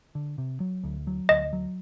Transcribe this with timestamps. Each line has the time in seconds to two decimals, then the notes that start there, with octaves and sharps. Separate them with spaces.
0.15 D3
0.38 C3
0.60 F#3
0.84 D2
1.07 F#3
1.29 D2 D#5
1.53 F#3